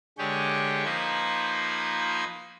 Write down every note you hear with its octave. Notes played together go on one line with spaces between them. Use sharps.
D3 G#3 G4 G#4 C#5 G5
F3 A#3 D#4 B4 C5 G#6